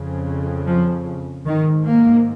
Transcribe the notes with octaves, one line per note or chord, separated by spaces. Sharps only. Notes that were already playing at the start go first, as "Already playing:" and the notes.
Already playing: F2 C#3
F3
G#2 D#3
A#3